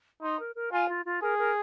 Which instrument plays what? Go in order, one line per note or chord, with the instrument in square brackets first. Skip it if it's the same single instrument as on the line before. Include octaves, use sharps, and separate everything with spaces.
[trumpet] D#4 [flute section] C6
[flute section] A#4
A#4
[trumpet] F4 [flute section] G#5
[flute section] F4
F4
[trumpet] G#4 [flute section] A#4
[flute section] A#4